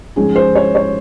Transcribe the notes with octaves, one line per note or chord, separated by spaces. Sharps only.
G#2 F3 G#3 C#4 G#4
C5
C#5
C#5